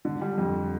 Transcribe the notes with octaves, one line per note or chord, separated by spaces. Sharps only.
D3
G3
F2